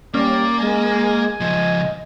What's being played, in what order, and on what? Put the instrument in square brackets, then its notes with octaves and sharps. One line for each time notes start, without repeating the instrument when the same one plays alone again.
[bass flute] G3 [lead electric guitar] A#3 [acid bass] C#4 [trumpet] D5
[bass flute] G#3 [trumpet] G#5
[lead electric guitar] C#2 F3 [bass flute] D#5